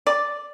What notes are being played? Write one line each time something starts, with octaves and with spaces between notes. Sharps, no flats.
D5